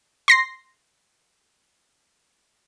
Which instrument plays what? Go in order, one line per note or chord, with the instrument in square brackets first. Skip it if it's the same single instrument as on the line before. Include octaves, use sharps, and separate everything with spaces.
[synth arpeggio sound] C6 A#6 C7